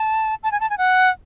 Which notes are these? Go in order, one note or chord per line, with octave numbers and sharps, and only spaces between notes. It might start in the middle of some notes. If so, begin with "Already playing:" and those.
Already playing: A5
A5
G#5
A5
G#5
F#5